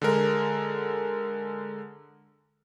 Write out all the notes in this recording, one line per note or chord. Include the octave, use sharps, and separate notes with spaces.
D3 G#3 A#4